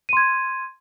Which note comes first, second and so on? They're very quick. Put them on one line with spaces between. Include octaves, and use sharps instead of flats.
D#7 C6 G#6